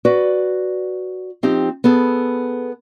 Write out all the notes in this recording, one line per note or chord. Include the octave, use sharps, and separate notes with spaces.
F#4 B4 D5
F3 C4 D#4 G4
B3 G#4 A4